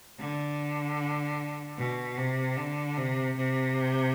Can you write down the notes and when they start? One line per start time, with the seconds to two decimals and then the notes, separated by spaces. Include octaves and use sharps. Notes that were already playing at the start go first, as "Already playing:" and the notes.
0.18 D3
1.78 B2
2.17 C3
2.57 D3
2.98 C3
3.37 C3